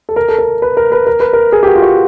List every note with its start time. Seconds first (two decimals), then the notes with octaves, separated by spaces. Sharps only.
0.09 A4
0.16 A#4
0.28 A4
0.39 A#4
0.62 B4
0.77 A#4
0.92 B4
1.07 A#4
1.20 B4
1.33 A#4
1.52 G#4
1.63 G4
1.67 F#4
1.75 F4
1.82 F#4